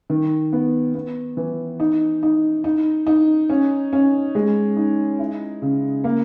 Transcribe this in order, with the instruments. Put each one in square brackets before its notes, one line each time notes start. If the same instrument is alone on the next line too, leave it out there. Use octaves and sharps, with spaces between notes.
[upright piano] D#3
B3
B3
E3
D#4
D#4
D#4
D#4
C#4
C#4
G#3
D#4
E4
C#3
A#3